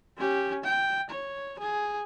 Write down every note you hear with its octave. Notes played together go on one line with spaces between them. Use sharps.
C#4 G4
G5
C#5
G#4